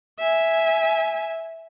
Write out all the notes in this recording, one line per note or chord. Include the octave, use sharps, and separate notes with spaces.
E5 G#5